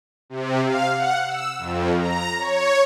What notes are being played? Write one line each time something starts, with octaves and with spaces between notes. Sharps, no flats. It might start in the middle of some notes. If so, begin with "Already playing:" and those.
C3
F5
F#5
E6
F2
A#5
C#5